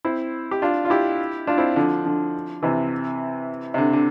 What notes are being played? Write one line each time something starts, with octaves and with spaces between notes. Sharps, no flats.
C4 E4
G4
D4 F4
F4
E4 G4
D4 F4
C4 E4
D3 F3
D3 F3
C3 E3
C3
D3
D3